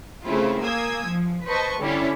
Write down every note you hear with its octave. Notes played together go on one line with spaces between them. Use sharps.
C#3 A3 C4 E4 F4
A#3 G#5 D#6 E6 G#6
F3
B4 C5 D#5 A5 C#6
D3 G3 C#4 E4